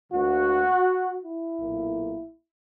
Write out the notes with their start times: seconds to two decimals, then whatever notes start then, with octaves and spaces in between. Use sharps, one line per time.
0.11 D2 D3 A#3 F#4
1.22 E4
1.60 B1 A#2 A#3